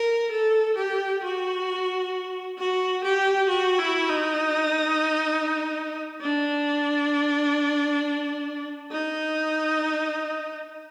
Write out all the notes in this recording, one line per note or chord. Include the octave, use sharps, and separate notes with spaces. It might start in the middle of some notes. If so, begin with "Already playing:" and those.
Already playing: A#4
A4
G4
F#4
F#4
G4
F#4
E4
D#4
D4
D#4